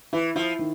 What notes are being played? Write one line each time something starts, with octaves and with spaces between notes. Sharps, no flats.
E3 E4
F3 E4
D#3